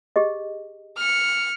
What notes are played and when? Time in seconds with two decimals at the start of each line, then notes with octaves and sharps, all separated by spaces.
0.16 G4 G#4 D#5
0.97 F6 C#7